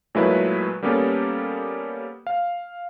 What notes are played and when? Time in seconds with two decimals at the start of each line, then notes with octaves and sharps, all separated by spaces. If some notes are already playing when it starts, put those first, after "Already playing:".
0.15 A#2 F#3 G#3 A3 E4 B4
0.82 G3 A#3 B3 C#4 G4 A4
2.27 F5